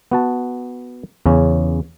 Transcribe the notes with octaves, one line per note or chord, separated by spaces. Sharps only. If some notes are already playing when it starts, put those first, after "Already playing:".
B3 F#4 A5
E2 C#3 C#4